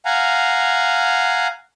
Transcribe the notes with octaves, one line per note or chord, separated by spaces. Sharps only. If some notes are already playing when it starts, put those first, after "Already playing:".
F5 F#5 G#5 A#5